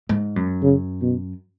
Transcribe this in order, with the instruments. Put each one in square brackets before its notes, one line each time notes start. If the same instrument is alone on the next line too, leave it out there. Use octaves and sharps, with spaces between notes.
[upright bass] G#2
F#2
[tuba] C#3
B2